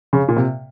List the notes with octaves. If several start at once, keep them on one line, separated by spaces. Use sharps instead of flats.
C#3
A#2
C3